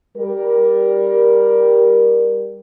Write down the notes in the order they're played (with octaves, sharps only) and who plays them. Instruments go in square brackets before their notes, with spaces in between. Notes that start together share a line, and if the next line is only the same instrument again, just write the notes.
[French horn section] G3 A#4